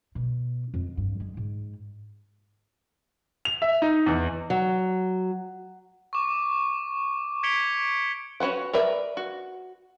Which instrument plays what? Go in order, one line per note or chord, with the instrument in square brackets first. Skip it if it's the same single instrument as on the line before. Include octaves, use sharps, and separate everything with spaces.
[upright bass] B2
F2
G2
G#3
G#2
[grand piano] F7
E5
D#4
E2
[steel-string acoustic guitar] F#3
[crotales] C#6 D6
G#6 B6 C#7 D7 F7 G7
[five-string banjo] C#4 F#4 B4 F#5
A#4 B4 D5 E5
F#4